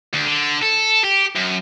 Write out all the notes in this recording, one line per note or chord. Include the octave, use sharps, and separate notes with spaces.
D2
D3
A4
G4
F#2